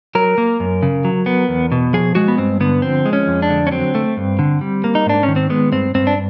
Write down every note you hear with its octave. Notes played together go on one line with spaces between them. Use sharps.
F#3 A#4
A#3
F#2
C#3
F#3
B3
E2
B2
F3 G#4
G#3 F#4
B3
G2 C4
D3 B3
F3 C4
G#3
C#4
F2
D4
D3
C#4
F#3 C4
A3
G2
D3
G3
A#3
D#4
G#2 D4
C#4
D#3
C4
G#3 B3
G2 C4
G2 C4
D4